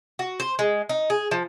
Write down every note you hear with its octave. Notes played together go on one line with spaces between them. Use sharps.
F#4
C5
G#3
D#4
G#4
F3